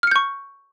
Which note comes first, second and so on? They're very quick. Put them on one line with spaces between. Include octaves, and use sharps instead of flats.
F6 C#7 G6 C#6